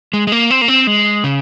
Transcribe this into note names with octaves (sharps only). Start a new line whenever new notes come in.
G#3
G#3
A#3
C4
A#3
C4
G#3
C#3